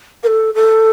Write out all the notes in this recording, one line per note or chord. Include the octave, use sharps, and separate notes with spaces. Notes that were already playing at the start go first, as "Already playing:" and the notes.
A#4
A4
A4